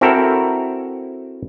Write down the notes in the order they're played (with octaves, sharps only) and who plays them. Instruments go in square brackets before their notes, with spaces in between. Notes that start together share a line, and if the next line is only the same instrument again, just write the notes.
[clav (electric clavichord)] C4 E4 F#4 A4 A#4